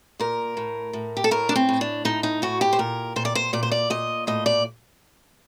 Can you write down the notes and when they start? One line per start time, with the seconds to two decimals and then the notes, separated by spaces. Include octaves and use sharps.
0.20 A#2 A#4
0.57 A2
0.93 A2
1.17 G4
1.24 A4
1.31 A2 A#4
1.49 D4
1.56 C4
1.69 A2
1.81 D4
2.05 A2 D#4
2.23 D#4
2.42 A2 F#4
2.61 G4
2.73 C5
2.79 A#2 A#4
3.16 A#2 C5
3.25 D5
3.35 C5
3.53 A#2 D5
3.63 C5
3.71 D5
3.90 A#2 D#5
4.27 A2 D#5
4.46 D5